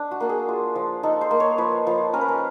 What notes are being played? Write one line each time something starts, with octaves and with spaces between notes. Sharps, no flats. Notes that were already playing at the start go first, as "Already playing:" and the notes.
Already playing: D4
F#4
A#3 A4
G#4
F4
F3
D#4 A4
C5
A#3
C#5
F3 B4
F3
C#4 A#4
B4
A#4